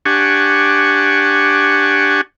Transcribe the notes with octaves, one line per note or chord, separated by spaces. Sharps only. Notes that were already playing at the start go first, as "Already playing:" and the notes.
D4 G4 F#5 G#5 C#6